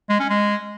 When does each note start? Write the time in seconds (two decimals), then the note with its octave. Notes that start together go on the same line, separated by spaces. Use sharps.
0.09 G#3
0.20 C#4
0.30 G#3